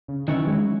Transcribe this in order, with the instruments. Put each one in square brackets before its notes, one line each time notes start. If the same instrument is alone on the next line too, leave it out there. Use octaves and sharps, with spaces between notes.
[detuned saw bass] C#3
[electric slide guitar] D#3 F#3 C#4 E4 [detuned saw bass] E3
[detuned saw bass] G#3